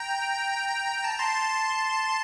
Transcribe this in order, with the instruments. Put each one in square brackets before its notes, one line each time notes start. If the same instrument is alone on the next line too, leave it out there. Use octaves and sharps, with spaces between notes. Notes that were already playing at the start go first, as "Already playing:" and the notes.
Already playing: [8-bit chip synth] G5 A#5
G5
A5
A#5
A5 C6